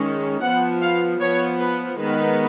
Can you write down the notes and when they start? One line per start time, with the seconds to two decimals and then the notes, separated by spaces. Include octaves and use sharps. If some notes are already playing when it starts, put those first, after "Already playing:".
Already playing: D#3 G#3 C#4
0.42 F3 B3 F#5
0.82 F5
1.21 F3 B3 C#5
1.60 B4
1.99 D#3 G#3 B3 B4